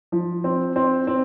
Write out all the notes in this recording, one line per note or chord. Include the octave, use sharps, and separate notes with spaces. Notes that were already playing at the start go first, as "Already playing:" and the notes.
F3
C4
C4
C4